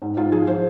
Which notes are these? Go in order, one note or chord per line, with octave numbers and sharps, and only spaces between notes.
G#2
G#2 F4
F3 G#4
F3 C5